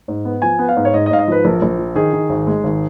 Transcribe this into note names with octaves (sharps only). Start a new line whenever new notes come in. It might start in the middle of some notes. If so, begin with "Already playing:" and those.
G#2
B3
F3 G#5
B3
F5
G#2
C#5
G#2 D#5
D#5
G#2 F5
D#5
F3 B4
A#1 A#4
A#1
F3
D#3 G#4
D#3
G#1
G#3
G#1